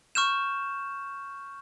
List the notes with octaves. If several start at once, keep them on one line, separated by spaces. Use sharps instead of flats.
C#6 F6 G6 E7